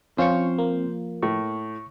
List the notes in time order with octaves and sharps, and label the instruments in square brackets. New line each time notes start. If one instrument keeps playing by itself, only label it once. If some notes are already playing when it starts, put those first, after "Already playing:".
[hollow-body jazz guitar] F3 [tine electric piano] C4 [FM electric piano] C#4 F4 C#6 [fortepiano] C5 F5
[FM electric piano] A#3
[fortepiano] A2 [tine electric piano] C#6